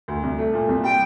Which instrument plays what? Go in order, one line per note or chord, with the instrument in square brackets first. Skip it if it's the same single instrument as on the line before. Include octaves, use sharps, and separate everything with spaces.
[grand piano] D2
C2
A3
A#2
C2
[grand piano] G3 [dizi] G5